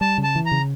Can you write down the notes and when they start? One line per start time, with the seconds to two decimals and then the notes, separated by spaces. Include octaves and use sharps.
0.01 G3 A5
0.18 C#3
0.23 A5
0.35 E3
0.46 A#5
0.51 C#3